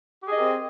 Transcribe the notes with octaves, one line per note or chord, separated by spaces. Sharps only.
C4 G4 G#4 A#4 D#5